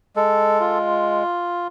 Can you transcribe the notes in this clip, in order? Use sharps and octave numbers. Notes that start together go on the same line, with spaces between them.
G#3 A4
F4